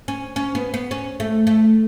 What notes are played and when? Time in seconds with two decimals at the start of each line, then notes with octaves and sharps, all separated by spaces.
0.08 C#4
0.36 C#4
0.55 B3
0.74 B3
0.91 C#4
1.20 A3
1.47 A3